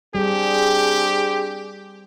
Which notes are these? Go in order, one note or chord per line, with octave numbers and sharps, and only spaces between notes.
G3 C4 D4 G4 G#4